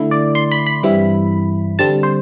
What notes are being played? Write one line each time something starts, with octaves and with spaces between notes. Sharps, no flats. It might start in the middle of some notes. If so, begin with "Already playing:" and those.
Already playing: D3 A3 E4
D5
C6
B5
B5
G2 E3 G3 C4 E4
D3 G3 C4 A5
C5